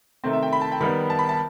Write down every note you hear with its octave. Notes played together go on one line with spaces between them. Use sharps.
C3 D#3 A3 C4
E5
G5
B5
A5
G5
D#3 G3 B3 B5
A5
B5
A5